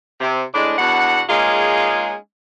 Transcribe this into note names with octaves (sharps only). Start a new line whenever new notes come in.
C3
A2 G#3 D4
E2 B2 D4 F#4 F#5
G#3 A#3 C#4 D#4 F4 G#4